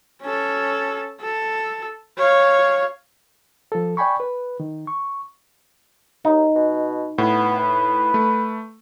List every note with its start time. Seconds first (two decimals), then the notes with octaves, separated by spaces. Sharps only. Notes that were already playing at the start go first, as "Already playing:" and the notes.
0.22 C#4 A4
1.20 A4
2.17 C#5 F5
3.72 F3 A4
3.97 D5 G5 G#5 B5 C#6
4.20 B4
4.60 D#3
4.87 C#6
6.25 D#2 D#4
6.55 B2
7.18 A2 B3
7.60 B4
8.14 A3